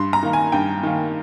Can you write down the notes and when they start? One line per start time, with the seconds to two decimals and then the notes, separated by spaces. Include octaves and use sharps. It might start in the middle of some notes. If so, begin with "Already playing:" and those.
Already playing: G2 C6
0.13 A#5
0.23 D#3 A#3
0.33 G#5
0.52 G2 G5
0.83 D#3 A#3